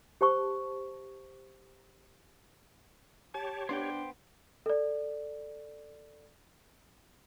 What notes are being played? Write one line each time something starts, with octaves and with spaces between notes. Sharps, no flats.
G4 C5 A5 C#6
G4 C#5 A5
B3 D4 C5 G5
A4 D5